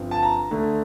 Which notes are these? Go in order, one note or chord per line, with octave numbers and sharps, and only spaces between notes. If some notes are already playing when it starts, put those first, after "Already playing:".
Already playing: G1 G2 F3 C4
A5
A#5
D2 D3 A3